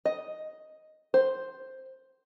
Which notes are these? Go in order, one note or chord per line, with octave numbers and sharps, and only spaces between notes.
D#5
C5